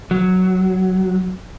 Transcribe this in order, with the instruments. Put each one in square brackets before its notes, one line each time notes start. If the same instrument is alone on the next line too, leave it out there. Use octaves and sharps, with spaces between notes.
[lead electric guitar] F#3